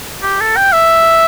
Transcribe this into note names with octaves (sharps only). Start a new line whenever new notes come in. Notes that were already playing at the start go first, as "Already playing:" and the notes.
G4
A4
G5
E5